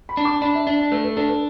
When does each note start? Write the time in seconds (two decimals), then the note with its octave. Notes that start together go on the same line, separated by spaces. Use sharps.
0.09 B5
0.17 D4
0.25 D6
0.35 A5
0.42 D4 B5
0.55 E5
0.67 D4 D5
0.79 D5
0.92 A3 B4
1.04 B4
1.17 D4 A4
1.29 B4